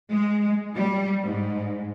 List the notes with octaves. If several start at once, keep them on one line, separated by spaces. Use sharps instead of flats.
G#3
G3
G#2